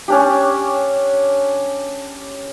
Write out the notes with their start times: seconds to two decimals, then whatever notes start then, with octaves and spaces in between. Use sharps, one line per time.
0.08 C#4 D4 G4